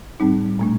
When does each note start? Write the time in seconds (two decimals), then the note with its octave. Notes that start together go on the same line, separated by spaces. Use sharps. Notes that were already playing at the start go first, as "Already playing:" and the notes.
0.20 A2 G3 C4 D#4
0.59 A#2 A3 D4